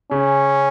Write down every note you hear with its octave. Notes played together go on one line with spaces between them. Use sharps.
C#3 C#4